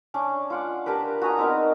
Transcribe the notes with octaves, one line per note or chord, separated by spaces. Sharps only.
C#4 D4 D6
F4 F#5 D6
D4 G4 A#4 B4
F#4 G#4 A#5 D#6
B3 C4 D#4 A#4